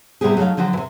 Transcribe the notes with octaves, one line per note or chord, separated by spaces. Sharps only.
A2 C3 G3 B3 G4 G#4
F#3 A3 D#4 C#5 F5
D3 F3 F#3 F#4 G5
C3 E3